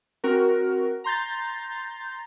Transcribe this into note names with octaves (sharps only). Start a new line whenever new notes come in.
C4 F#4 A#4
A#5 C6 G6 A6